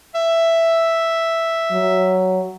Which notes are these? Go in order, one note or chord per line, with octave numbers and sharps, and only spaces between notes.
E5
F#3